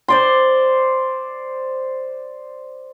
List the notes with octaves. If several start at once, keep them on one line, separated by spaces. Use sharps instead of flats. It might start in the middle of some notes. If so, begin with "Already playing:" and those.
C5 D5 C6